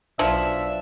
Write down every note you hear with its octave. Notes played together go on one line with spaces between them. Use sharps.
B1 F3 D4 E5